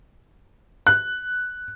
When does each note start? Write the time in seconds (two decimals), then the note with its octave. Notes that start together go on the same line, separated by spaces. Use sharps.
0.87 F#6